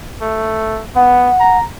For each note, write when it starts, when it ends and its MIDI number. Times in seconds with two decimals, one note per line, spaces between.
0.22 0.82 57
0.96 1.30 59
0.96 1.58 78
1.40 1.63 82